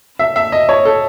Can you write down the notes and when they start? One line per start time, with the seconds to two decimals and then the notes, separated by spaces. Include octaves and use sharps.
0.19 E5
0.36 E5
0.52 D#5
0.69 C#5
0.85 A4